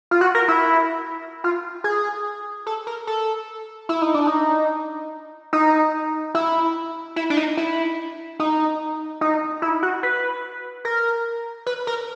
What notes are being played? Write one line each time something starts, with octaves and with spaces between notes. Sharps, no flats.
F4
F#4
A#4
E4
F4
G#4
A4
A#4
A4
E4
D#4
D4
D#4
D#4
E4
E4
D4
D#4
E4
D#4
D#4
E4
F#4
B4
A#4
B4
A#4